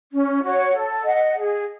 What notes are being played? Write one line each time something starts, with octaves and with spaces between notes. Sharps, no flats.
C#4
F#4 C#5 F#5
A4
D#5 F#5
G#4